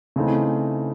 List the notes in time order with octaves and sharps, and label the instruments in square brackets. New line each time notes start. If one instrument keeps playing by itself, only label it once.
[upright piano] C#3 E3 A3 C4 D#4